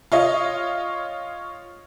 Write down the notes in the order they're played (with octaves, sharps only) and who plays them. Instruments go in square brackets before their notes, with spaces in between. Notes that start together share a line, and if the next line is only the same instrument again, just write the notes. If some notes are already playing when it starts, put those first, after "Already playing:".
[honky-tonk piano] F4 C#5 D#5 F5